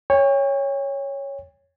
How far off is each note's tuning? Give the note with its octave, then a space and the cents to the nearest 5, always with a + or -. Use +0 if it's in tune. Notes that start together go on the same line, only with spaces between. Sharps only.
C#5 +0 G5 +45